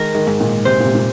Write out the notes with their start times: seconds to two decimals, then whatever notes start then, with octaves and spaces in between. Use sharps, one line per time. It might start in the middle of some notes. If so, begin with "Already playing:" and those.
Already playing: D#3 G#3 A#4
0.15 D#3 G#3
0.27 G#2
0.40 A#2 D#3
0.65 C3 C5
0.80 A#2
0.85 C3
0.95 A#2